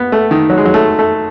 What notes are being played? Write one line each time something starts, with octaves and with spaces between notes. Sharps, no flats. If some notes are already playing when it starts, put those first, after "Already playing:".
Already playing: B3
A3
D#3
F#3
G#3
F#3
A3
A3